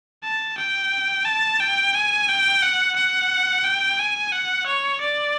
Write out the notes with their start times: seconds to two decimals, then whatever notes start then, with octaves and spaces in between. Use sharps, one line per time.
0.23 A5
0.58 G5
1.25 A5
1.60 G5
1.94 G#5
2.28 G5
2.63 F#5
2.96 F#5
3.64 G5
3.99 G#5
4.32 F#5
4.66 C#5
5.01 D5